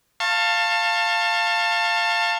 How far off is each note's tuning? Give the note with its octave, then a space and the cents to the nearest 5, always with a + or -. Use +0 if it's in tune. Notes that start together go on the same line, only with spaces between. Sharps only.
F5 -5 A5 +20 C#6 -35